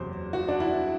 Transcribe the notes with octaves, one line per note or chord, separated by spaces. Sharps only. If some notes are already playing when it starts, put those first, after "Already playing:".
Already playing: F#1 E2 C3 F#3 C5
F#4
D4
E4